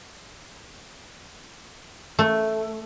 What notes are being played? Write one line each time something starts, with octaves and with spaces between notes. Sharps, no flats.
A3